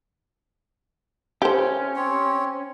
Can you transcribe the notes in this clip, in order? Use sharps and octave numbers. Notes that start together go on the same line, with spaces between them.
C#4 G4 C5
C4 C#5